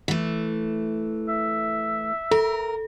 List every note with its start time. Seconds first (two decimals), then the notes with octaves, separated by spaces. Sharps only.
0.08 E3 A3
1.29 E5
2.31 A4 A#4